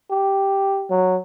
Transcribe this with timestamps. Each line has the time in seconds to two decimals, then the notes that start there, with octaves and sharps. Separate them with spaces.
0.10 G4
0.90 F#3